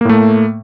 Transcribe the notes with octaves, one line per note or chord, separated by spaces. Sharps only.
A2 A3 A#3